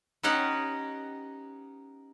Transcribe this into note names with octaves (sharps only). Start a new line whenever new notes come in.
B3 C#4 D#4 G4 D#5 F#5